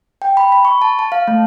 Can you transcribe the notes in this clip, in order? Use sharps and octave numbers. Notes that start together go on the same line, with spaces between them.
G5
B5
B5
C#6
A5
A5
F5
A3